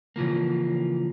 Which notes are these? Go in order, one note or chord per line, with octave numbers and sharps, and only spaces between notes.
C#3 E3 F3 A#3